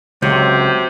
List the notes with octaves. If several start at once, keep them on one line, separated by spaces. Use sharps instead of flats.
C#2 C3 F#3 G6